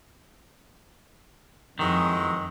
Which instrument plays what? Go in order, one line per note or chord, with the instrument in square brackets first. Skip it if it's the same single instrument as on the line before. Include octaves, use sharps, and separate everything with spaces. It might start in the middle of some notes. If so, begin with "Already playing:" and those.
[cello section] F2 [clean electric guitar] D#3 [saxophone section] E3 F#3 G#3